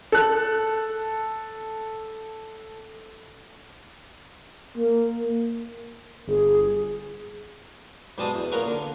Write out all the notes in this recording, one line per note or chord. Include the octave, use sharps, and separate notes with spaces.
A4 F#6
A#3
G1 G#4
G#2 B2 G3 G#3 A5 D#6
E2
A#2 B3 A#4 C#5 F#5 C#6
D3